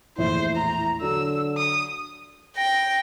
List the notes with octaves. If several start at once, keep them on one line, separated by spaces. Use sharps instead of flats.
A#1 E2 A2 E4 C5
E4 A#5
D3 F#3 E6
D#6
G5 A#6